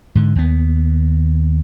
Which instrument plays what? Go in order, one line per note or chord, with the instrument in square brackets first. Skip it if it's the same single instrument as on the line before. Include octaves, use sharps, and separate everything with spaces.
[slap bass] G#2 D3
D#2 B3